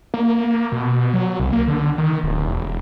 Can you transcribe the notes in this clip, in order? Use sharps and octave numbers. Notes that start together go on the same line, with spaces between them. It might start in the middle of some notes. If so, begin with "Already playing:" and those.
A#3
B2
F#3
C2
A#3
D3
D#3
D1
E1